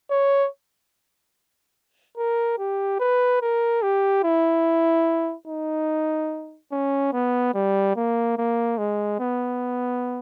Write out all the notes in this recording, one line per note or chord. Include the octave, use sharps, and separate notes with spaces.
C#5
A#4
G4
B4
A#4
G4
E4
D#4
C#4
B3
G3
A#3
A#3
G#3
B3